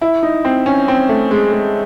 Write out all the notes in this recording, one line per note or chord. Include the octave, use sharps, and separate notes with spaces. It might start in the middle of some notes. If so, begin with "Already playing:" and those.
E4
D#4
C4
C#4
C4
A3
G#3
G#3